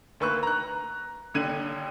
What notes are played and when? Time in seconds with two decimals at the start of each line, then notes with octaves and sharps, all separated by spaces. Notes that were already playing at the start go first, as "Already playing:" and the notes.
0.20 D2 A#3 B4 C#6 E6 F#6
0.43 A#5 F#6
1.34 D#1 D#2 D3 G#6 D#7 F#7